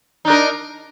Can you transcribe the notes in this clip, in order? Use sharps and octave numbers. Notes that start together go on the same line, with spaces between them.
D4 D#4 A#4